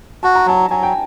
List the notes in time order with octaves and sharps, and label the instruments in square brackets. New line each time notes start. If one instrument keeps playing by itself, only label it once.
[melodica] F#4 [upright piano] A5
[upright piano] A#5
[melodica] F#3 [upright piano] A5
[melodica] F#3 [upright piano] G#5
[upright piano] G5